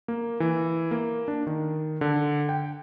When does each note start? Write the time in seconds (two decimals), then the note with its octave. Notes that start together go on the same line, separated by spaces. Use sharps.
0.08 A#3
0.40 E3
0.91 A#3
1.28 D4
1.47 D#3
2.01 D3
2.49 G5